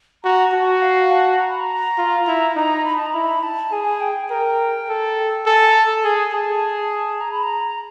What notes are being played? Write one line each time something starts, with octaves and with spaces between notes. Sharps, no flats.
F#4 A#5
F#4 A5
F#5
F5
A5
A#5
B5
A#5
F4
E4
D#4 A#5
B5
A5
A#5
E4 B5
A5
G#4 G#5
G5
A#4 G5
A4
A4 G#5
A#5
A5
G#4 G#5
G#4 A5
A#5
B5
A#5